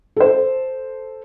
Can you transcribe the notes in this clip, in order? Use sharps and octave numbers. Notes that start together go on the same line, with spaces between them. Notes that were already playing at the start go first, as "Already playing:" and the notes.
A4 C5